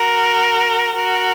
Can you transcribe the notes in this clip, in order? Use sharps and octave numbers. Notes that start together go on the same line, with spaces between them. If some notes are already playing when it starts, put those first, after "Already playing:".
Already playing: F#4 A#4
F#4 A#4